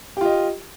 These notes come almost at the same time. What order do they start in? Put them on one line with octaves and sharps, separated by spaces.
G4 F4 D#5